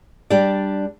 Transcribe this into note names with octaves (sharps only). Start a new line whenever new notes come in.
G3 D4 G4 D5